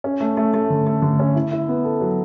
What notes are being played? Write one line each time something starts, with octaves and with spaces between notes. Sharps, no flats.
C#4
A3
A3
A3
D3
A3
D3
C#4
E4
E4
B3
A4
F#3